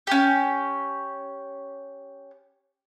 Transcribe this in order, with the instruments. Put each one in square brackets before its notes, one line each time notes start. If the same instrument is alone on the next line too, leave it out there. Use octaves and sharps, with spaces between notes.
[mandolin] C#4 G4